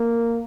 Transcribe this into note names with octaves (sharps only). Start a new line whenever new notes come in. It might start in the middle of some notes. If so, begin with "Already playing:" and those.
Already playing: A#3